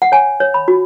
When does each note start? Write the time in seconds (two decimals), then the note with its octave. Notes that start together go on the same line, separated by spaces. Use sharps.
0.02 F#5
0.12 C#5 G#5
0.40 C#5
0.54 B5
0.68 F#4